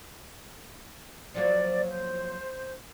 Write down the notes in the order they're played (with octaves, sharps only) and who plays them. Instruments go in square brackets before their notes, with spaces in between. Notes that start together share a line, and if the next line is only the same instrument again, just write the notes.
[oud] F3 F#3 A#3 [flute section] D5
[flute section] C5